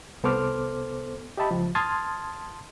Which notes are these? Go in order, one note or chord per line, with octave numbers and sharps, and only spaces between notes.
C2 B3 A4 C5 D6 F6
G4 D#5 E5 A5 B5
C#2 F3
A5 C6 D#6 F6 G#6 A6